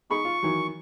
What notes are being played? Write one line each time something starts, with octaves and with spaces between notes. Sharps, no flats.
D#4 G#4 B5 C#6
F4
D#3 E3 F#3